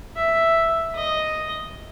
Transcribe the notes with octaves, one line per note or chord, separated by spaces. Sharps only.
E5
D#5